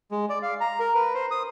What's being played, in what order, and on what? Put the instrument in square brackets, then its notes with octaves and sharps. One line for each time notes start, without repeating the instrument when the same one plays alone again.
[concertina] G#3
D5
F5
A#5
A#4
B4
C5
D#6